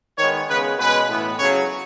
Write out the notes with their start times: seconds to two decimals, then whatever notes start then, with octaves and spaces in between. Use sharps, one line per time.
0.18 D#3 G#3 B3 C#5
0.49 C#3 G#3 B3 B4
0.78 B2 G#3 C#4 B4
1.08 A2 E3 B3
1.38 C#3 F#3 C#4 C#5